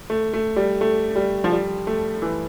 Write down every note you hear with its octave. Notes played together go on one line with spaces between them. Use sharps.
A3
A3
G3
A3
G3
F3
G3
A3
E3